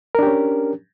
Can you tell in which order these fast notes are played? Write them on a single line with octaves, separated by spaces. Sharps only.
A#4 D4 G4 C#4